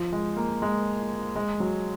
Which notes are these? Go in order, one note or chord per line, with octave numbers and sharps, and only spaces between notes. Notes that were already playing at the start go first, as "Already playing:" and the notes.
Already playing: F3
G#3
A#3
G#3
G#3
F#3